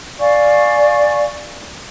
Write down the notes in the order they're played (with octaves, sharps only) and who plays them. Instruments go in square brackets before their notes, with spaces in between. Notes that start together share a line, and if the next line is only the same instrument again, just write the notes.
[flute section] D5 F5 G#5 C#6